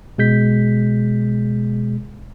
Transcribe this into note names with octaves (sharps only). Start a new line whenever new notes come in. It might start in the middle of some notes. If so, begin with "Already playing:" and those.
B2 G#3 G6 B6